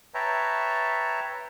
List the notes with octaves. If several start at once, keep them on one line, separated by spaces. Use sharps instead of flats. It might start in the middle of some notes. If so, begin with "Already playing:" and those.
B4 C#5 E5 G5 A5 A#5